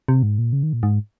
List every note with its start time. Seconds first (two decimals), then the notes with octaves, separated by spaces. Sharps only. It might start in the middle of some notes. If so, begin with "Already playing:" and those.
0.08 C3
0.23 G#2
0.38 A#2
0.53 C#3
0.63 D#3
0.73 A#2
0.83 G#2